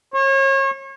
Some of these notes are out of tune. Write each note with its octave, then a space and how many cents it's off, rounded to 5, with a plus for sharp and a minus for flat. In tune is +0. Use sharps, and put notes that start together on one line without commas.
C#5 -35